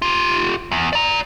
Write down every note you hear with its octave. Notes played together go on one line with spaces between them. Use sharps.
F4 G4
E2
D5 A#5